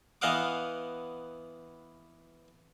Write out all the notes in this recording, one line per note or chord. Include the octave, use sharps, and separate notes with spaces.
E3 B3 D#5 F5 F#5 D6